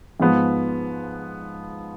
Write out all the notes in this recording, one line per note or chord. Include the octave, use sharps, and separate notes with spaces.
G#2 F3 B3